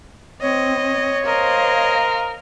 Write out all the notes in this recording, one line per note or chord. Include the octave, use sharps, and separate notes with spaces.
C4 C#5 D#5
A#4 C5 D#5 F5